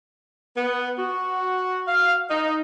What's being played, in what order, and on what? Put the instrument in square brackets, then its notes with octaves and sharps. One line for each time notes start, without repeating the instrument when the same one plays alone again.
[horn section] B3
F#4
F5
D#4